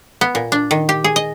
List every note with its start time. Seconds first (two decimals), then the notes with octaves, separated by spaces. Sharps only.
0.21 B3
0.35 A#2
0.52 D4
0.71 D#3
0.89 G4
1.04 G#4
1.16 D#5